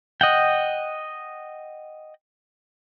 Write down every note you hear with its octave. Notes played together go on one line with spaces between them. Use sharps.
D#5 F#5 G5